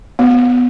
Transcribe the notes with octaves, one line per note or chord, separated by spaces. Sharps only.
B3